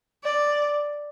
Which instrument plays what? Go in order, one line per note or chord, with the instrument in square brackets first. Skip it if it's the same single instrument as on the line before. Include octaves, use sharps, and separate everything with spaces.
[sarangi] D5